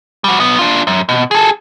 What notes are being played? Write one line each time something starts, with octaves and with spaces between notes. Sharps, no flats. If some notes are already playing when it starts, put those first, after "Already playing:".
G3 F#4
B1 B3
D4 F4
F#2
B2
G#4 A4